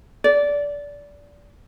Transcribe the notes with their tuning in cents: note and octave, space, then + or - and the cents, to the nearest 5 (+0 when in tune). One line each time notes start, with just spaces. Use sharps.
D5 -20